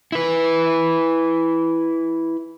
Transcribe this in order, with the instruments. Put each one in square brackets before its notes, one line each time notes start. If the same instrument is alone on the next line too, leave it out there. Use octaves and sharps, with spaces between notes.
[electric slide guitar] E4 B4